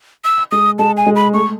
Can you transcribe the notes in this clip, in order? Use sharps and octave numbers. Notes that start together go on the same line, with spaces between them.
E6
G#3 D#6
G#3 A5
G#5
G#3
B5
A3 C#6